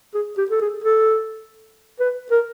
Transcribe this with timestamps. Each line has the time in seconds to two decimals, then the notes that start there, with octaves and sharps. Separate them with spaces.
0.14 G#4
0.38 G4
0.50 A4
0.61 G#4
0.84 A4
2.00 B4
2.31 A#4